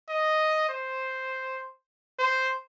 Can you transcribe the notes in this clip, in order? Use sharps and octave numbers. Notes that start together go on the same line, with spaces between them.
D#5
C5
C5